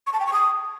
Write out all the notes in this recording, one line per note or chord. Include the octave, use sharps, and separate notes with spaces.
C#6
A5
G5
C#6
D#6